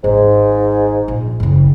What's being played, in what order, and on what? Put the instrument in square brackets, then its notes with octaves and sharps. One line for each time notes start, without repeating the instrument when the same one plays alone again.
[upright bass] G#1 [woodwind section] G#2
[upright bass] A#1
F#1 C#3